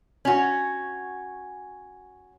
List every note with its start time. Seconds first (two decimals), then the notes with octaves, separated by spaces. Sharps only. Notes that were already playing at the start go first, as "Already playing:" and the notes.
0.25 C#4 F#4